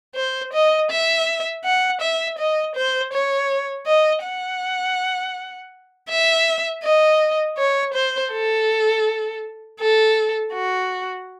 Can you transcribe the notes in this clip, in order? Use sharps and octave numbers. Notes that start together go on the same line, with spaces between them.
C5
D#5
E5
F#5
E5
D#5
C5
C#5
D#5
F#5
E5
D#5
C#5
C5
A4
A4
F#4